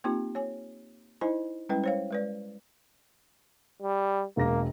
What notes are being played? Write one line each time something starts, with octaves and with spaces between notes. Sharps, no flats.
A#3 C4 D#4 F4 G4
C#5 G#5
D#4 E4 C5 D#5 G#5
G3 G#3 C#4 E4 B4 G5
C5 C#5 F5
G#3 B4 D5
G3
E1 G#3 A#3 A#6